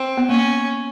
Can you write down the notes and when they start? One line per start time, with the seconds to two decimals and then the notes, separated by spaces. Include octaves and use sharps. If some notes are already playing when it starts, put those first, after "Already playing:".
Already playing: C4
0.17 B3
0.29 A#3 C#4